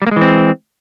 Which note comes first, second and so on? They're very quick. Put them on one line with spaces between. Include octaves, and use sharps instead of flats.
G3 A#3 G#3 E3 C4